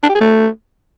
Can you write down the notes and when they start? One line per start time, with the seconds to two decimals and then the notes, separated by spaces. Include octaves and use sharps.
0.03 D4
0.09 G4
0.15 G#4
0.21 A3